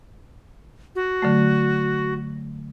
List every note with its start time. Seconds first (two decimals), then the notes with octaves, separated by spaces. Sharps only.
0.95 F#4
1.22 D3 F#3 A3